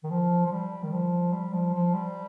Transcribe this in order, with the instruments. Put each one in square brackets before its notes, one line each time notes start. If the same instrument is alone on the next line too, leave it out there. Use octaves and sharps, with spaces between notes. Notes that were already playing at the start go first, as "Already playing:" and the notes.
[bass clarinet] D#3
F3
F3
G3
D#3
F3
G3
F3
F3
G3